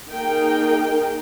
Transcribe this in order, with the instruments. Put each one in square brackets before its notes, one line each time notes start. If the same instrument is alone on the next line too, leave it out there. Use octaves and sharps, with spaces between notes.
[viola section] A#3 D#4 G#4 A#4 G5